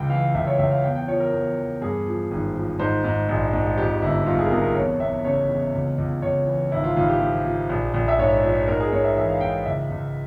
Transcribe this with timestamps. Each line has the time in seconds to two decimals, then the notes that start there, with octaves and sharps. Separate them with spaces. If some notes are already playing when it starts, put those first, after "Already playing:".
Already playing: C#2 G5
0.09 E3 F5
0.34 C#2 E5
0.47 C#5
0.59 C#2 E5
0.71 F5
0.83 E2 G5
0.95 G5
1.08 F3 C#5
1.20 A#4
1.33 E2
1.57 E2
1.81 G2 G#4
2.06 F3
2.31 G#1
2.55 F3
2.79 G#2 C5
3.04 G#2
3.28 A#1
3.53 G#2
3.78 F2 G4
4.02 G1 E4
4.26 G1 F4
4.39 G#4
4.46 A#4
4.51 C3 G#4
4.64 A#4
4.75 E2 C#5
5.00 E2 E5
5.25 C#3 C#5
5.49 E2
5.74 C#2
5.98 C#2
6.22 C#2 C#5
6.47 E3
6.71 G#1 E4
6.84 F4
6.96 G#1 F4
7.08 G4
7.20 F3
7.45 F3
7.69 A#1
7.94 A#1
8.08 E5
8.18 G#2 C#5
8.43 F3
8.68 G#2 A#4
8.80 G#4
8.92 G#2 C#5
9.04 E5
9.17 E3 E5
9.29 F5
9.41 G#2 G5
9.66 C#2 E5
9.90 C#2